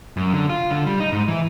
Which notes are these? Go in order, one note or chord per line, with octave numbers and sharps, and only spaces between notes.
F#2
D3
F4
D3
G3
D#4
G#2
E3